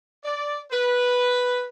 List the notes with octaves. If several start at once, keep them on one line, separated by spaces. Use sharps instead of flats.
D5
B4